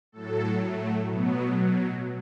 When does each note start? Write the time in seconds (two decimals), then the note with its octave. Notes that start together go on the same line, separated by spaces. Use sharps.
0.12 A2 F#3 A4
0.60 A3
1.08 B2 F#3 B3